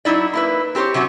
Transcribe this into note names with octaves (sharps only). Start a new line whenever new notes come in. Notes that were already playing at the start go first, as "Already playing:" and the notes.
F#3 B3 D#4 E4 D5
A#3 E4 B4
C4 G4 A#4 C5 C#5
C3 F#3 C#4 F#4